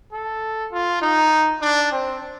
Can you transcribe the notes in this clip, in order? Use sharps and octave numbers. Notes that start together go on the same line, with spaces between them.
A4
F4
D#4
D4
C4